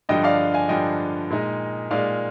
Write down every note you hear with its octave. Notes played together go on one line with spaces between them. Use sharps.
G2 D3 F3 D#5 G5
D5 F5
F5 G#5
G2 D3 F3 D#5 G5
A#2 G#3 D#4
A#2 G#3 D#4 D5 F5